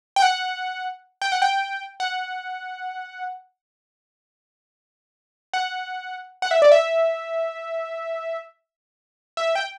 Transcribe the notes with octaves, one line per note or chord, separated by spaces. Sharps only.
G5
F#5
G5
F#5
G5
F#5
F#5
F#5
E5
D5
E5
E5
G5